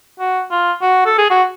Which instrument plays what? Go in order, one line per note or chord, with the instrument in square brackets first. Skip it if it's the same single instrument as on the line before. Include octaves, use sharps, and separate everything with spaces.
[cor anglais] F#4
F4
F#4
A4
G#4
F#4